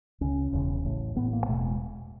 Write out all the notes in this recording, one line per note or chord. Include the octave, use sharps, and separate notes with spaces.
C#2 C#3 C#4
E1 E2 C#3
A1 A2
A1 A2 B3
A#3
E1 E2 B2 A3
G#3